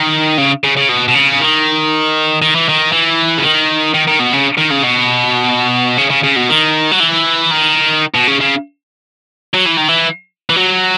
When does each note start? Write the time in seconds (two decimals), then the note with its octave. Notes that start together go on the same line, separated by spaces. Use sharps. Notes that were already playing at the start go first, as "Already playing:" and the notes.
Already playing: D#3
0.38 C#3
0.64 C#3
0.77 C#3
0.89 B2
1.08 B2
1.15 C#3
1.40 D#3
2.42 D#3
2.55 E3
2.69 D#3
2.92 E3
3.38 C#3
3.44 D#3
3.94 D#3
4.08 D#3
4.20 B2
4.33 C#3
4.58 D#3
4.71 C#3
4.84 B2
5.98 C#3
6.10 C#3
6.24 C#3
6.36 B2
6.49 D#3
6.91 F#3
7.00 E3
7.51 D#3
8.14 B2
8.27 C#3
8.40 C#3
9.54 F#3
9.66 E3
9.77 D#3
9.89 E3
10.50 E3
10.56 F#3